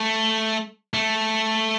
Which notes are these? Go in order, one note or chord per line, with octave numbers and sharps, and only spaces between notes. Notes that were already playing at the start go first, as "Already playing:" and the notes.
Already playing: A3
A3